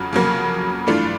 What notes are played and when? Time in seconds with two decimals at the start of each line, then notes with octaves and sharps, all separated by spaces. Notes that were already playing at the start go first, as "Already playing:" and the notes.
Already playing: F2 C#3 F#3
0.13 F2 C#3 F#3 A#3
0.87 G2 E3 A3 D4 F4